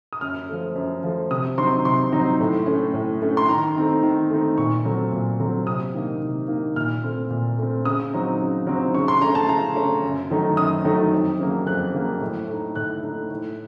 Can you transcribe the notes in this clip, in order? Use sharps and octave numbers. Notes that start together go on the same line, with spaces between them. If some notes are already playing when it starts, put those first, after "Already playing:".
D#6
F#2 F6
F3 A3
F#2
F3 A3
C3 D#6
F#3 C4 D#4 C6
C3 C6
F#3 C4 D#4
A2
A3 C#4
A2
A3 C#4
C6
D#3 A#5
A3 C4 D#4
D#3
A3 C4 D#4
A#2 C#6
F#3 A3 C4
A#2
F#3 A3 C4
C3 D#6
D#3 A#3 D#4
C3
D#3 A#3 D#4
A#2 F6
A3 C4
A#2
A3 C4
C#3 D#6
F#3 C4 D#4
C#3
F#3 C4 D#4
C#3 C#6
C6
A3 C#4 A#5
A5
C#3 A#5
A3 C#4
F#2
D#3 F#3 A3 D#4
F#2 D#6
D#3 F#3 A3 D#4
F2
C#3 F#3 A#3
F2 F#6
C#3 F#3 A#3
A2
A3 D#4
A2 F#6
A3 D#4
A2